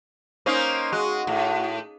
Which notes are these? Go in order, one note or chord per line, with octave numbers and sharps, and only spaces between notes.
A#3 C#4 D#4 C5
G#3 F#4
A2